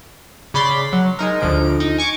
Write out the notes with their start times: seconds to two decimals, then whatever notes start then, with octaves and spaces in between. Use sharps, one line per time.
0.54 C#3 D5 B5 C6 A6 B6
0.93 F#3
1.19 G#3 D#4 A#4
1.41 D2 D3 F3 D7
1.80 D#4
1.98 G#5 C#6 D6